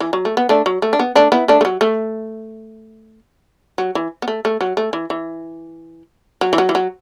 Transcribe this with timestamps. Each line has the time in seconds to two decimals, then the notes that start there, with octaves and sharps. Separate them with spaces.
0.00 E3
0.13 F#3
0.25 A3
0.37 B3
0.49 A3 D4
0.66 F#3
0.82 A3
0.93 D4
0.99 B3
1.15 A3 D4
1.32 B3 E4
1.48 A3 D4
1.61 A3
1.65 F#3
1.81 A3
3.78 F#3
3.95 E3
4.22 B3
4.28 A3
4.45 A3
4.61 F#3
4.77 A3
4.93 E3
5.10 E3
6.41 F#3
6.53 E3
6.58 F#3
6.69 E3
6.75 F#3